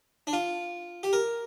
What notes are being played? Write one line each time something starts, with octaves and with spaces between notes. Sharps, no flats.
D4
F4
G4
A#4